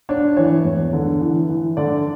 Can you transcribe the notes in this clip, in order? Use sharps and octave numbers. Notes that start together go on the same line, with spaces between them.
D4 C#5
E3 C#5
E2
D3
E3
E3
D3 D5